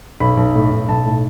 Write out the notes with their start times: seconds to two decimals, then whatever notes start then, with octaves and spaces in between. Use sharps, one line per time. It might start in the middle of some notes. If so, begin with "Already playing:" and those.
0.20 B1 B5
0.37 B1
0.55 A2
0.72 B1
0.89 B1 A5
1.05 A2